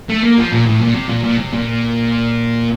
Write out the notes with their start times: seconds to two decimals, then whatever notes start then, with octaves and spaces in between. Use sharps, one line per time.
0.09 A3
0.23 A#3
0.38 F3
0.52 A#2
0.67 A2
0.81 A#2
0.95 C3
1.09 A#2
1.24 A#2
1.38 C3
1.53 A#2